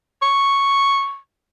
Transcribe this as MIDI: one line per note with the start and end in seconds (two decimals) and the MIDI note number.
0.22 1.18 85